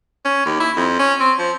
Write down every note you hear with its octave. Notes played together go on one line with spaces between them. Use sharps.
C#4
D#2
E4
F2
C#4
C4
F3